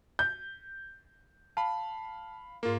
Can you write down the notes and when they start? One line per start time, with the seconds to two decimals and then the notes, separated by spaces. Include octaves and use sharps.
0.19 G6
1.57 F5 A5 B5
2.63 G#2 A#3 F4 A#4